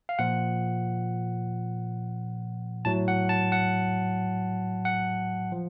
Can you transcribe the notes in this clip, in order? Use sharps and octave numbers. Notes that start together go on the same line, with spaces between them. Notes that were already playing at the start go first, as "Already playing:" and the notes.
F5
A#2 F3 F#5
A2 F#3 A5
F#5
A5
F#5
F#5
F3